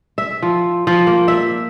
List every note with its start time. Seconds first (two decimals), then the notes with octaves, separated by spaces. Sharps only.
0.18 E5
0.42 F3
0.87 F3
1.07 A#3
1.28 E5